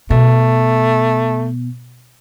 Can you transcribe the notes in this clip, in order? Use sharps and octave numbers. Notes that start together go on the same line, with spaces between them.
B2 A3